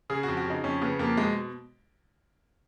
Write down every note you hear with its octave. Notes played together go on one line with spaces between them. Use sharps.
C#3 G#4
F#4
F2
F#4
C#3 D#4
F2 C#4
C#3 B3
F2 A#3
B2 G#3